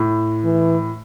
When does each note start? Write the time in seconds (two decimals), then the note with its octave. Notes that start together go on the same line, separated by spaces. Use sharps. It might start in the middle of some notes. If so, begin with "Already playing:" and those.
Already playing: A2
0.44 E3